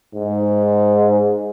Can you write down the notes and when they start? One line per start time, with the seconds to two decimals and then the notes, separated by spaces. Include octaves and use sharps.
0.14 G#2